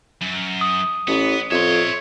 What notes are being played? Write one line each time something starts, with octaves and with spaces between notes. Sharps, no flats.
F#2
D#6
A1 B3
F2 C#5 E5 C6